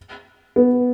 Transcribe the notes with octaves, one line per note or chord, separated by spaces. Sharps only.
B3